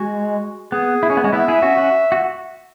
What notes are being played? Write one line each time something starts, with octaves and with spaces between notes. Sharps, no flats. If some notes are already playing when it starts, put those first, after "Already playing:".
Already playing: G#3 F#4
B3 G#4
E4
C#4
B3
G#3 C#4
B3 E4 E5
E4 G#4
C#4 F#4
C#4 F#4
F#4